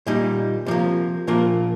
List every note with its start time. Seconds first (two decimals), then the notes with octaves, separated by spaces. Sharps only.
0.07 A#2 G3 D#4
0.66 C3 F3 A#3
1.27 A#2 F3 A#3 F4 A#4